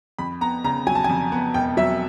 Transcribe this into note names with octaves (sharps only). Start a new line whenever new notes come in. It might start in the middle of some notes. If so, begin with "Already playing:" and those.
F2 B5
B3 A#5
C#3 A#5
F#3 G#5
A5
F2 G#5
B3
E1 G5
F#3 E5